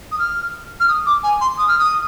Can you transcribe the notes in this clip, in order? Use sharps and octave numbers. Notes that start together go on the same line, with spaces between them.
D#6
F6
F6
D#6
D6
G#5
C6
D#6
F6
D#6